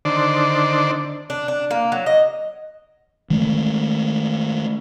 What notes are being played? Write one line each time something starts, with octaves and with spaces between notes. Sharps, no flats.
D3 D#3 D4 C5 D5
D4
D4
A#3
F#3
D#5
D#3 G#3 A3